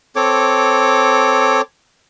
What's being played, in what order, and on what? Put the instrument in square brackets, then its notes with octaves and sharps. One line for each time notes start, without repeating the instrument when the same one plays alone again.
[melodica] C4 A4 C#5 D6